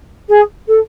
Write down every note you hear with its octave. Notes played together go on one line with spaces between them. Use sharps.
G#4
A4